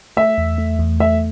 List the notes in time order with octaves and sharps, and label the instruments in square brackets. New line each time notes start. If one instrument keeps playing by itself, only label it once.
[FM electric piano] A3 [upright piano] E5
[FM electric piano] E2
A3
E2
[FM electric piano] A3 [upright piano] E5